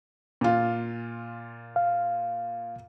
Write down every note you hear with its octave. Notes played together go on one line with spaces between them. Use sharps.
A#2 F4
F5